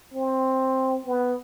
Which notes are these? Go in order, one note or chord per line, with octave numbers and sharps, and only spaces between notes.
C4
B3